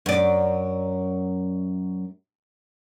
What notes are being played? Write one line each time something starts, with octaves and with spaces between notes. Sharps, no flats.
F#2 D5